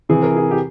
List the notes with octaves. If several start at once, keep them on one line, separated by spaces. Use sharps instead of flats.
C3 E3 G#4
A#4
G#4
G4